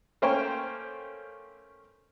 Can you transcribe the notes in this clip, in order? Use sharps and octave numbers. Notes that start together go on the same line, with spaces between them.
A3 A#3 C#4 C5 G5 C#6